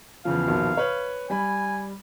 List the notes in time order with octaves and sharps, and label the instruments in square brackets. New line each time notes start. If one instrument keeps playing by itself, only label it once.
[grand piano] E2 C#3 F3 [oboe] F5
[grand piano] A#1 B2 D#3
B4 C#5
[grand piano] G3 B5 [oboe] G#5